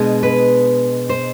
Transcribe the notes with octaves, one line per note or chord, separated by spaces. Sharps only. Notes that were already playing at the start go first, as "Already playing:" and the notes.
Already playing: B2 G#3 B3 D4
B4
C5